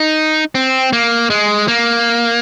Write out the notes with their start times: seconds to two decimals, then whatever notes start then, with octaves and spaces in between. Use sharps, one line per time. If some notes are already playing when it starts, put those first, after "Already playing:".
Already playing: D#4
0.55 C4
0.93 A#3
1.30 G#3
1.68 A#3